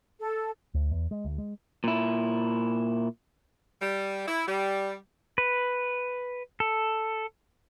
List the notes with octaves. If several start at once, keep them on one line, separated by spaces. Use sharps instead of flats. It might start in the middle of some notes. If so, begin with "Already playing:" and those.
A4
D2
E2
G#3
D2
G#3
A#2 E4
G3
E4
G3
B4
A4